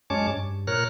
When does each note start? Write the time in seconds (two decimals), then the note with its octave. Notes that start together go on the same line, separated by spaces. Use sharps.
0.10 F#2 G#3 C#4 C#5 A5 D6
0.28 G2
0.67 A#2 A#4 C#5 F6 F#6